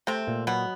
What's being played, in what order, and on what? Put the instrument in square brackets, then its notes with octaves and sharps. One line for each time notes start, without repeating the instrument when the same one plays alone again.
[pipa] C3 C4 [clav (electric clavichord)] A3
[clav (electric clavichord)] A#2
[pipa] B2 B3 [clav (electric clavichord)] F#3